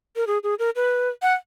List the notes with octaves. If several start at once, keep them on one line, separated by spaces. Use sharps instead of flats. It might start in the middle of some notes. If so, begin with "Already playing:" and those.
A#4
G#4
G#4
A#4
B4
F#5